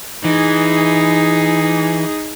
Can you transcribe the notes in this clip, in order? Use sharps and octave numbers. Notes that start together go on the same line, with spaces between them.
E3 D#4 G#4